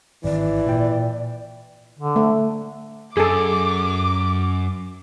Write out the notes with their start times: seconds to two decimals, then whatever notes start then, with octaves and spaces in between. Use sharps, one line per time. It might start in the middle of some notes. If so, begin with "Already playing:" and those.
0.24 G#1 E3 D5
0.67 A#2 G5
1.99 D3
2.16 A3
3.17 F#2 G#4 A4 D6